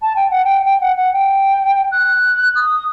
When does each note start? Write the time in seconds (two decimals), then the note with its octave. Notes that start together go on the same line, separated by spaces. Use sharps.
0.01 A5
0.15 G5
0.30 F#5
0.44 G5
0.65 G5
0.80 F#5
0.96 F#5
1.13 G5
1.91 F#6
2.55 D#6